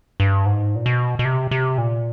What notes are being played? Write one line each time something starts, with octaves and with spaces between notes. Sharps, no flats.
G2
G#2
A#2
B2
B2
C3
C3
A#2